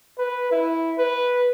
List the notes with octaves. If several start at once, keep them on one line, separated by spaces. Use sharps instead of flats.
B4
E4
B4